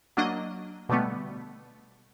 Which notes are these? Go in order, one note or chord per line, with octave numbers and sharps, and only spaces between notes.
F#3 A#3 D4 D#5
B2 D3 G3 A3 B3